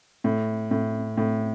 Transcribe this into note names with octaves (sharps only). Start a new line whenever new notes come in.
A2
A2
A2